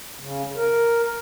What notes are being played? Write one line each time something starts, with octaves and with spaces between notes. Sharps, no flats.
C#3
A#4